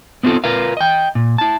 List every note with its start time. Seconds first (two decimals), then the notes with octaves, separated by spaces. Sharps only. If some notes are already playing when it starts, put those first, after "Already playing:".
0.23 B3 C4 D#4 F4 A4
0.44 F4 A#4 B4 F5
0.77 D#5 G5
1.15 A#2
1.38 E4 A5